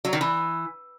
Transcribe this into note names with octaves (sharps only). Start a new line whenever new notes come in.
F#3
D#3
E3